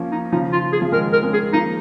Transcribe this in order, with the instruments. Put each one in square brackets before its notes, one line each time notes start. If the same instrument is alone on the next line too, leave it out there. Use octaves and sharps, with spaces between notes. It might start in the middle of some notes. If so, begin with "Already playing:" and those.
Already playing: [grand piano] F3 A#3 C#4
[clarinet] D#4
[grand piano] C#3 F3 [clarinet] D#4
[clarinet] F4
G#4
[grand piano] F3
[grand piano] D#3 G#3 [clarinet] A#4
[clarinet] A#4
[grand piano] G#3 C#4
[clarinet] G#4
[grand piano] F3 A#3 [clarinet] D#4